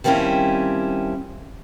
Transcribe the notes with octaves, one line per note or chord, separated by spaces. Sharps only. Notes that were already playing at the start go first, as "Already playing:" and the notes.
D#3 F3 G3 C4 C#4 E4